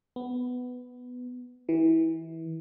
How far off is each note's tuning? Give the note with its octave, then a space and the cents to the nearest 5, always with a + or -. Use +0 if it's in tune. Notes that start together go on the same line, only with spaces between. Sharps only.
B3 +10
E3 -25